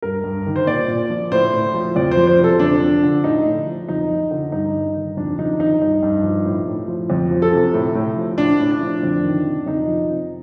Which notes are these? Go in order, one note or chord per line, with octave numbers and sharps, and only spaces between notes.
G2 A#4
G2
D#3
C5
A#2 D5
A#2
F3
A2 C5
A2
F3
F2 D5
C5
F3
C5
C3
A4
F2 D4
F3
D3
A2 D#4
A2
F3
F2 D#4
F3
D3
G2 D#4
G2
D#3
F2 D4
F2 D#4
D#3 D#4
G2 D#4
G2
F3
A2
A2
F3
F2
F3
A4
C3
A2
A2
F3
A2 D4
A2
D4
F3
F2
D#3
C3
F2 D#4
F3
C3